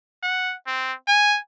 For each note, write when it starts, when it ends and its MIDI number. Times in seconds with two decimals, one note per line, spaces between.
0.23 0.54 78
0.67 0.93 60
1.08 1.38 80